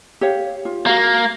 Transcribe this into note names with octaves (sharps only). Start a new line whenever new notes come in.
G4 C#5 F5
F4
A#3 F#4 F5